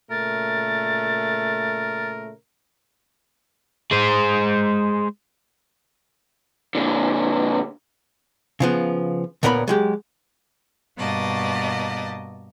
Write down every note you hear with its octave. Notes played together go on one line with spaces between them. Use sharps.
A#2 C#3 A3 A#4 A6
G#3 C5
A#2 D3
C#3 F3 B3
D2 A#2 B3 A#4 C#5 B5
F#3 G#3 G4
G2 B2 A#3 D5 D#5 A5